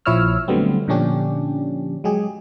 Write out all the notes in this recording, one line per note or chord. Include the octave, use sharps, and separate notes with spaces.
A#1 F3 E4 C#5 E6 F6
D3 F#3 G3 A3 B3 C4
A#2 D3 F3 C#4 D4 G4
F#3 G#3 G4 G#4